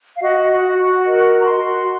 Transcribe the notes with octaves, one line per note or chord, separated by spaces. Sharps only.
F5
F#4 D#5
F#4
F#4
A#4 D#5
F#4
A#5
C6
F#4